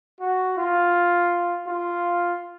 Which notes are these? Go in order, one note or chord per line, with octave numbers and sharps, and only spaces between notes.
F#4
F4
F4